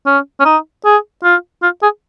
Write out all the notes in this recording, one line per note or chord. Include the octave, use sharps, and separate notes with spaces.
C#4
C#4
D#4
G#4
F4
F4
G#4